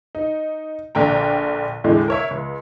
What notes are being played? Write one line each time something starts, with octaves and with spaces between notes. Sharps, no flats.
D#4
A#1 D3 G5 A#5
E2 A2 D3 G#3
A#4 C#5 E5
C#2